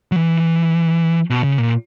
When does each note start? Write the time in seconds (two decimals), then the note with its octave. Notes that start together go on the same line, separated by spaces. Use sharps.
0.12 F#3
0.16 E3
1.30 B2
1.44 C#3
1.58 A#2